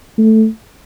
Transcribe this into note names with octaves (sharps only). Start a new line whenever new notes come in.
A3